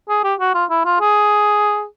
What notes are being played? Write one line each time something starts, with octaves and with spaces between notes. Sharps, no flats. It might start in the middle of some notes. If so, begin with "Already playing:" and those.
G#4
G4
F#4
F4
E4
F4
G#4